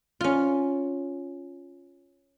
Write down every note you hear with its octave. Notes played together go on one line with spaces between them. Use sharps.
C#4 F4